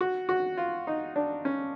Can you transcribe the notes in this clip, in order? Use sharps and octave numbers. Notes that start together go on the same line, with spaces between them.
F#4
F#4
F4
D#4
D4
C#4